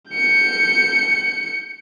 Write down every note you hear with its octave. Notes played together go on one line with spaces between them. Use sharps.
G6 C#7